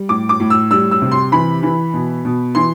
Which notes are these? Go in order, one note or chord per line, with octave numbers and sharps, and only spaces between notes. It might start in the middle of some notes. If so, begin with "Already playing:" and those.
Already playing: G3
A2 D6
D6
A2
E6
G3 E6
E6
C3
C6
E3 B5
E3
B2
B2
E3 C6